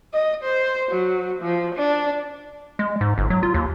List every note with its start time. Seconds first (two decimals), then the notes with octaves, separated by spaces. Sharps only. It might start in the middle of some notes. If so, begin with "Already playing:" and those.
0.13 D#5
0.44 C5
0.91 F#3
1.42 F3
1.75 D4
2.79 G#3
3.01 G#2
3.18 G1
3.30 F#3
3.43 F4
3.54 D#2